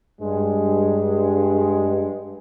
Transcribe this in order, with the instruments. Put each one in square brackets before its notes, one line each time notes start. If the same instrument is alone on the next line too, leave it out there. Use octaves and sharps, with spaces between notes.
[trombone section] G2 G#3